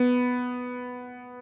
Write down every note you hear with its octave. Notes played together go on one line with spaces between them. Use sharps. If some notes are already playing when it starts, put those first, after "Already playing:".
Already playing: B3